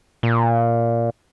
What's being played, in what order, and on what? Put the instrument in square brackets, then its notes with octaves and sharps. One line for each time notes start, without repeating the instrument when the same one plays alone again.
[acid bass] A#2